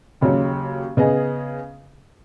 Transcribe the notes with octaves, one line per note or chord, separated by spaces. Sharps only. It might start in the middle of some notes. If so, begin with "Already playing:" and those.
D#2 C#3 F#3 C#4
C#3 B3 G#4 D#5